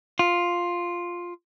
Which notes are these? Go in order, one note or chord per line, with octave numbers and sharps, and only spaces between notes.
F4